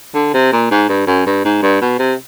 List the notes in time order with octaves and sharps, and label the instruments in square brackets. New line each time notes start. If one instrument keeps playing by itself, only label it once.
[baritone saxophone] D3
C3
A#2
G#2
G2
F#2
G2
G#2
G2
B2
C3